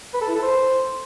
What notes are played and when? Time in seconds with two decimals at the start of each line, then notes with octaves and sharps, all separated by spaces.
0.14 B4
0.21 A4
0.28 E4
0.35 A4
0.42 C5